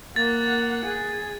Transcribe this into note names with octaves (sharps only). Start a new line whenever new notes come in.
A#3 F#5 A6
G#4